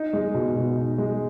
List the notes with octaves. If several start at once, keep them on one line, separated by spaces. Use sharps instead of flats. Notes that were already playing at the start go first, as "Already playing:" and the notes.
Already playing: D#4
G#3
B2
B2
D#4
G#3